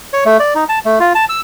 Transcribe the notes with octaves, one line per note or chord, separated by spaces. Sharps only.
C#5
A3
D5
D#4
A5
A3
F4
A5
E6